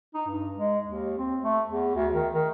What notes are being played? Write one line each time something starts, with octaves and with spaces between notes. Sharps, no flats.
D#4
G2
G#3
D#2
C4
A3
E2
D2
D#3
D#3